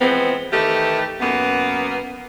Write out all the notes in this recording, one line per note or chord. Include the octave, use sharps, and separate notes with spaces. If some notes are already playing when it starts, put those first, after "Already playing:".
E3 F3 G#3 B3 C4
D#3 E3 A3 G4
F#2 A#3 B3